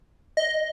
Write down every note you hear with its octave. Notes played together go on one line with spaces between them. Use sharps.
D#5